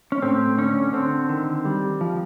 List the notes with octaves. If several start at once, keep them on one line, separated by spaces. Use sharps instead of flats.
C#4
A2 C4
D3 C#4
D3 C4
D#3
G3
F3